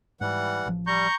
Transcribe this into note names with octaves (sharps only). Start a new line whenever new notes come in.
G#2 E3 G3 F#5
A1 F3
G3 A#5 C#6 G6